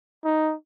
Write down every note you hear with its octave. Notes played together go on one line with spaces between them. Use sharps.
D#4